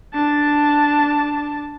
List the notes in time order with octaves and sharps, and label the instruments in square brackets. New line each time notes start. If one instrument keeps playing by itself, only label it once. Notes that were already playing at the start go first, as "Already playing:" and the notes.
[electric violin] D4 A5